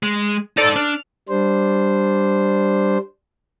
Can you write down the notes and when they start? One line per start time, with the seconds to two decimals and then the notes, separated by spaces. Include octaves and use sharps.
0.03 G#3
0.57 D#4 A4 C5 D5 A6
0.76 D4 F6
1.29 G3 D4 C5